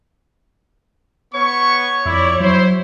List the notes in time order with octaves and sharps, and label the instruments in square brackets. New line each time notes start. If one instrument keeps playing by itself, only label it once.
[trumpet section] B3 C#6 [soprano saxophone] C#5
[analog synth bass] F2 [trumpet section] E4 D5
[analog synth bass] F#3 [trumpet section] E4 C5